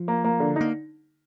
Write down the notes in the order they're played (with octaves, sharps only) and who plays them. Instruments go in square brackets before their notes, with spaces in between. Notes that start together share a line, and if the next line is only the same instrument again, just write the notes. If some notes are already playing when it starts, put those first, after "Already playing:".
Already playing: [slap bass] F3
[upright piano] A#3
A#3
D3
[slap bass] A#3 [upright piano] D#4